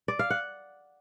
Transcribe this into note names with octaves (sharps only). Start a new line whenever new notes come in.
D5
F5
F#5